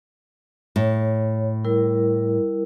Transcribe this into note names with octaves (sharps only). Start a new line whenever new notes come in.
A2 C#5
G3 E4 A#4